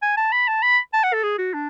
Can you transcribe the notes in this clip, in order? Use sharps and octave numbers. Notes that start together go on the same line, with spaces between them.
G#5
A5
B5
A5
B5
A5
F#5
A4
G#4
F#4
D4